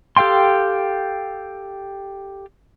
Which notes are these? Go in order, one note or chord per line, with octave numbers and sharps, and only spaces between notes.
G4 A4 F5 G5 C6